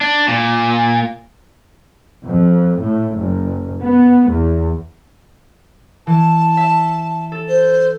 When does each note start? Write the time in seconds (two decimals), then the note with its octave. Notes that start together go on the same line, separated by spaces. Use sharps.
0.01 D4
0.28 A#2
2.25 F2
2.80 A2
3.16 F#1
3.84 B3
4.31 E2
6.07 E3 A5
6.57 E5
7.32 A4
7.48 C5